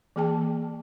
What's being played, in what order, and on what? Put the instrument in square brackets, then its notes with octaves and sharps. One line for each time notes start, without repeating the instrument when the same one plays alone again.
[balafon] E3 A#3 G#4 G5 A5